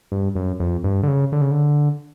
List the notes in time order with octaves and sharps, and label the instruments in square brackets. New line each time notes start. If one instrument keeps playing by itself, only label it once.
[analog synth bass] G2
F#2
F2
G2
D3
C#3
D3
C#3
D3